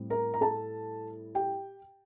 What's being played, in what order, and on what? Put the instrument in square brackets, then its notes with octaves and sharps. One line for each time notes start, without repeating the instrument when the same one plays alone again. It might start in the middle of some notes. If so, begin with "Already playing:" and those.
Already playing: [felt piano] A2 G3 C4
A#4 A#5
A#5
A4 A5
G4 G5